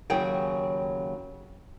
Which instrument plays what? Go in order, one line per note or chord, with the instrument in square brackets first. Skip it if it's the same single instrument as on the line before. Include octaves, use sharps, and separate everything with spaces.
[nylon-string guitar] D#2 C#3 F#3 G#4 G5